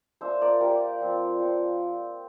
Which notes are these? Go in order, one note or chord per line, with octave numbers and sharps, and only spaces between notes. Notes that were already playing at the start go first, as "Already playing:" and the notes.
A#3 D4 F4 C5 E5
A#4 D5
A#3 D4 F4 G4 A#4
F3 C4 F4
F3 C4 F4